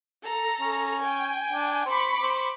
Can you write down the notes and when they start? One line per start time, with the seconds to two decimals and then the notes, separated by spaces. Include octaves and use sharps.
0.23 A4 A#5
0.61 C#4
1.01 G5 G#5
1.53 D4
1.86 C5 B5 C#6 D6
2.22 C5